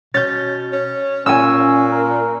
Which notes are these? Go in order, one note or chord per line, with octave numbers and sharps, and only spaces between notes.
B2 C#4 G6 A6
C#4
A#2 C#4 G#5 E6
A#4